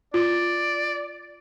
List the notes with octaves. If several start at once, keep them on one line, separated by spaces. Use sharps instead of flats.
F4 D5